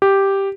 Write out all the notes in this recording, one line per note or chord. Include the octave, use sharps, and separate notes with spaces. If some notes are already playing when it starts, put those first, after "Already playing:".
G4